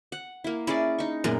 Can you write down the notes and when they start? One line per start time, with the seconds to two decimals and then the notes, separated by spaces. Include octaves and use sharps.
0.12 F#5
0.44 A#3 E4
0.67 C#4 E4 G#4 D5
0.99 D#4 C#6
1.24 F#2 A#2 G#3 B3 A#4